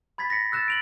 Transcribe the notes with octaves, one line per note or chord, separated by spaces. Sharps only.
B5 G#6 A6 B6
A#6 B6 C#7
E6 F#6 A6 E7
D7 F7 F#7